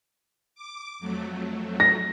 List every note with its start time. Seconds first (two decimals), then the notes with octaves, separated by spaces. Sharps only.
0.55 D6
0.99 F2 F#3 A3
1.80 A#6